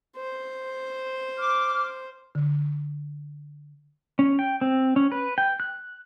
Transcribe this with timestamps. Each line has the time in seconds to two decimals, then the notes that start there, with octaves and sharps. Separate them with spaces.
0.17 C5
1.38 D6 F6
2.35 D3
4.19 C#4
4.39 G5
4.61 C4
4.96 C#4
5.12 B4
5.38 G5
5.60 F#6